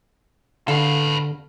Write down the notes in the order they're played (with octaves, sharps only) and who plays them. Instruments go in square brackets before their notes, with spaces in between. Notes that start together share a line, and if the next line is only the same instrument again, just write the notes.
[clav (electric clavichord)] D3 [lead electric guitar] A4 B4 [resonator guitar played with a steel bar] F5